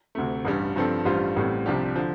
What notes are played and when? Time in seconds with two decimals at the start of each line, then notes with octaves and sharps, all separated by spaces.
0.15 D2 C3 A3
0.45 A1 G2 G3
0.76 G2 F3 C4 A4
1.05 A1 G2 G3 F4 C5
1.36 A1 A2 G3 C4
1.66 C2 C3 F3 D4 G4
1.96 D3 F3